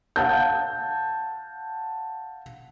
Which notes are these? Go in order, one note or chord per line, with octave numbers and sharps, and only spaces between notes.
F5 F#5 A5 G6